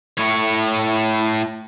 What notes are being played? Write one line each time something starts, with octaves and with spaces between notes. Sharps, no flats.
A2 C#5